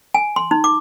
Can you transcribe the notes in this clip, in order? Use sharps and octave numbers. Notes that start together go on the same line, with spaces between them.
G#5
C6
D#4
D6